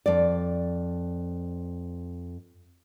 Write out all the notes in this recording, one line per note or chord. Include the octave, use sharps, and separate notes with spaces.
F2 D5